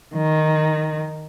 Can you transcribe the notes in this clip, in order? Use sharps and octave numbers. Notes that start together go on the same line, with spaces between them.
D#3